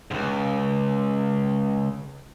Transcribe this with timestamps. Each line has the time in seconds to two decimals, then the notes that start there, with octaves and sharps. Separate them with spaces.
0.11 C#2 G#2